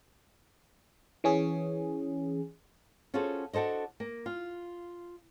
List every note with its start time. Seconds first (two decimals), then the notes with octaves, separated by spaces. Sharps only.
1.24 E3 C#4 G#4
3.14 C#4 F4 F#4 G#4 A4 C5
3.53 D4 F#4 A4 C5 D#5
4.00 A#3
4.26 F4